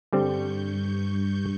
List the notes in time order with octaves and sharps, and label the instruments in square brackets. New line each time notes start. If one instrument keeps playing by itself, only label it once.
[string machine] G2 C#6 G6 [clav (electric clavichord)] D3 G3 C4